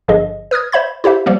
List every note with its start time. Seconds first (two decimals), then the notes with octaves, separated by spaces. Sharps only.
0.08 G1 G2 F3 G#4 D#5
0.51 B4 D#6 F6 G#6
0.72 C5 E5 B5 G#6
1.04 E4 G4 C5 E5
1.26 F3 G3 A#3 B3